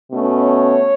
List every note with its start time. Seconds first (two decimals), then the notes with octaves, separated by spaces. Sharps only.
0.11 B2 A3 C#4
0.43 C#5